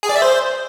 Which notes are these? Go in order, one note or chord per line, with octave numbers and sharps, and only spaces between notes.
G#4
D5
E5
C5